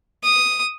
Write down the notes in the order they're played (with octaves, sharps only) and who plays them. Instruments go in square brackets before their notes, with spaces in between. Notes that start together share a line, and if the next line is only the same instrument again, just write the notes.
[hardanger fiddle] D#6